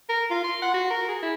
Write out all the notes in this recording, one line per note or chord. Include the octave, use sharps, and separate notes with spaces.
A#4
F4
C6
F#5
F#4
A#4
G#4
E4